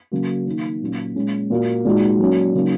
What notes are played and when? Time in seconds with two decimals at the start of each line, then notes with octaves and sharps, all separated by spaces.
0.11 C#3 F#3 A#3 F#4
0.46 D#3 A#3 D#4
0.81 A#2 F#3 A#3 C#4
1.16 A#2 G#3 C#4
1.50 A#2 A#3 F#4
1.85 A#2 G#3 D#4 F#4
2.19 F#3 A#3 C#4 F#4
2.55 C#3 F#3 A#3 D#4